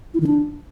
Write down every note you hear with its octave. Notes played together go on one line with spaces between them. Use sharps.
E4
D#3
D4